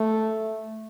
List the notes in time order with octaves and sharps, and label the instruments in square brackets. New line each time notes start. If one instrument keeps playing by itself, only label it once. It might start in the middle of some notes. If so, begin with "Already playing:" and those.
Already playing: [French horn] A3